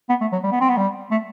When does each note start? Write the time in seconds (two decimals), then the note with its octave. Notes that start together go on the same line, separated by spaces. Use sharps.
0.09 B3
0.21 A3
0.32 F#3
0.43 G3
0.52 B3
0.61 C4
0.69 B3
0.77 G3
1.11 A3